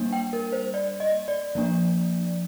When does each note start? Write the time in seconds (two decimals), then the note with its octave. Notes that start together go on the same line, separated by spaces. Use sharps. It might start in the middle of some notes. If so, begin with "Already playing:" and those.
Already playing: G3 A#3 D4
0.13 G5
0.33 A#4
0.52 C5
0.74 D5
1.00 D#5
1.28 D5
1.55 F3 A#3 D4